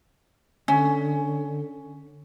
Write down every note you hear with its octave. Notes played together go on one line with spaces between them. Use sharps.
D3 C#4